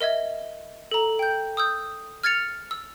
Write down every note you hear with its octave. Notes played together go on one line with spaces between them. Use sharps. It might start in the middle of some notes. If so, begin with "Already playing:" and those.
A#4 D#5 E5 G#6
A4 A#5
G5 G6
D#6 E6 G6
F6 G#6 A6 C#7 F7
E6